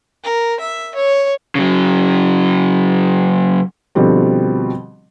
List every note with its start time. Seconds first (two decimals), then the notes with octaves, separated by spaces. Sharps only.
0.24 A#4
0.60 E5
0.95 C#5
1.55 C#3 F#3
3.95 B2 D3 F3 G3 C4